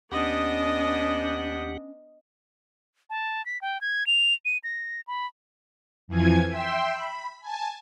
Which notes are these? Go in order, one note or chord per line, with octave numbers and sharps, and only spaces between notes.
D#2 B3 C#4 D4 G4 D#5 F#5 D#6
A5
B6
G5
G#6
F7
D#7
A#6
B5
F2 E3 F3 G#5 G#6
E5 G5 C6 E6
B5
G#5 A5